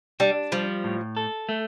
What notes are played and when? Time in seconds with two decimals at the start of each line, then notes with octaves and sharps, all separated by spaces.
0.20 G3 D4
0.52 F3 G3
0.84 A2
1.17 A4
1.49 A3